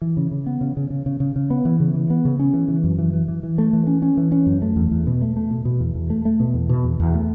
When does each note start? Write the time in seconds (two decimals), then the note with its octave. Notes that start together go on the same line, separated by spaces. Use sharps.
0.01 E3
0.17 C#3
0.31 C#3
0.46 B3
0.61 C#3
0.77 C#3
0.90 C#3
1.06 C#3
1.20 C#3
1.36 C#3
1.50 B3
1.65 E3
1.80 C#3
1.94 E3
2.10 B3
2.25 C#3
2.39 C#4
2.54 E3
2.68 E3
2.84 F#2
2.98 E3
3.13 E3
3.28 E3
3.43 E3
3.58 A3
3.73 E3
3.87 C#4
4.02 C#4
4.17 E3
4.32 C#4
4.46 F#2
4.62 A3
4.76 E2
4.91 E2
5.07 B2
5.21 A3
5.36 A3
5.51 B2
5.65 B2
5.80 E2
5.95 E2
6.10 A3
6.25 A3
6.40 B2
6.54 E2
6.69 B2
6.84 E2
7.00 E2
7.14 A3